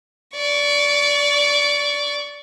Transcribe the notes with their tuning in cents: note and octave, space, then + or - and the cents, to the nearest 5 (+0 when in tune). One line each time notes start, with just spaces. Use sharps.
D5 -15 C#6 +20